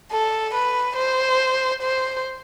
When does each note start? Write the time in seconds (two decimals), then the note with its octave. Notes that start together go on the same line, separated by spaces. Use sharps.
0.11 A4
0.54 B4
0.97 C5
1.82 C5